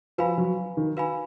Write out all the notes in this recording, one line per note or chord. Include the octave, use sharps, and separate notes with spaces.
F3 F#4 B4 F5 G#5 B5
F#3
D#3
F#4 B4 F5 G#5 B5